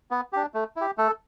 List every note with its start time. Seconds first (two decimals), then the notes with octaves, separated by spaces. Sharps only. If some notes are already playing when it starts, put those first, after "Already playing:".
0.11 B3
0.33 D4 G4
0.54 A3
0.76 E4 G4
0.98 A3 A4